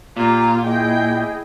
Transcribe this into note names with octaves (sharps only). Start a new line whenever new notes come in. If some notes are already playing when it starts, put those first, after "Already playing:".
A#2 F4 G4 A#5
E4 G#4 D#5 G5